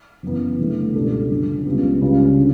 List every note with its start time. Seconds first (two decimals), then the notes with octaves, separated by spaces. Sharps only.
0.23 F#1 F#2 E3 B3
0.58 G1 G2 E3 A3
0.94 C#2 B2 G3 D4 A4
1.29 F#2 D3 F#3 C#4
1.65 C#2 C#3 G3 B3
2.01 C#2 C#3 G3
2.38 D3